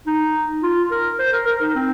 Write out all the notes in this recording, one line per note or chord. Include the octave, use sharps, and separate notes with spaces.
D#4
F4
A#4
C5
A#4
A#4
D#4
C4